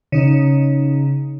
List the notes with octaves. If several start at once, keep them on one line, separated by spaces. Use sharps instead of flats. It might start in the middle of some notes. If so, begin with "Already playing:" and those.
C#3 D#4